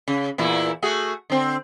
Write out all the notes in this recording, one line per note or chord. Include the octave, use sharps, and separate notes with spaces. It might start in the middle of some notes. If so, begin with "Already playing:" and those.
C#3
E2 A#2 E4
A3 F#4 G#4
D3 C4